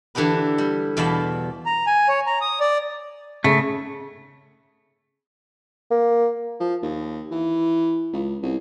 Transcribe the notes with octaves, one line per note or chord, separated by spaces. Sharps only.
D3 E3 D4 G4 B4
G3
E2 B2 F5 A5 B5
A#5
G#5
C#5
A#5
D#6
D5
C#3 A3
A#3
F3
D#2
E3
C#2
C2